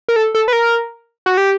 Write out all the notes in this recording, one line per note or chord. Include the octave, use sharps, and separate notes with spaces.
A#4
A4
A4
B4
A#4
F#4
G4